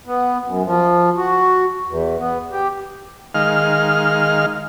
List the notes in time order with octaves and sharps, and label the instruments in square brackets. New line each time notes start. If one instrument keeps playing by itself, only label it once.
[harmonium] B3
F#2
F3
F#4
E2
B3
G4
[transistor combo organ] D#3 G#3 F5 F6